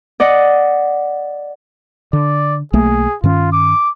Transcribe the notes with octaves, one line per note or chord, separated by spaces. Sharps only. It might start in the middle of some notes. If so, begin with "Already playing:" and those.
D5 D#5 F#5
D3 D5
B1 A3 A#3 G#4
G2 D#3 C#4 F4
D6